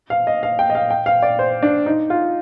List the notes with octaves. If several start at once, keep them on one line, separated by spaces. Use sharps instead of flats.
F5
D#5
F5
G5
D#5
F5
G5
F5
D5
C5
D4
D#4
F4